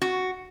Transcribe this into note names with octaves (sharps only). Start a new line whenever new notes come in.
F#4